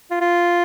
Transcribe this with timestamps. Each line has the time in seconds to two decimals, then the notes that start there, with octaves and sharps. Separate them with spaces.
0.11 F4
0.21 F4